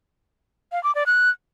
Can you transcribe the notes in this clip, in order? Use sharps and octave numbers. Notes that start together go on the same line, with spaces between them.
F5
D6
D5
F#6